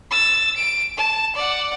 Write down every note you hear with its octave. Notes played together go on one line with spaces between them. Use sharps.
E6 A6
D7
A5
D5 F#5